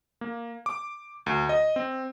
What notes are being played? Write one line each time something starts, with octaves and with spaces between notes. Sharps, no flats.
A#3
D6
D2
D#5
C4